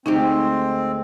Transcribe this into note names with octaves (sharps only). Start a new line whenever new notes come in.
D2 G#3 C4 D#4 G4